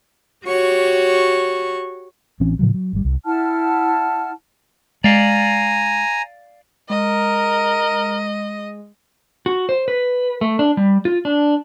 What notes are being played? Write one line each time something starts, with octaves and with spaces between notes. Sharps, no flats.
F#4 G4 C#5 C#6
A1 E3 C4 C#4
A2 C#3 F3 F#3
F#3
G#1 G3
C2
E4 F#5 A5 F6
G#3 D5 F5 G#5 A#5
G#3 A#4 D#5
F#4
C5
B4
A3
D4
G3
F4
D4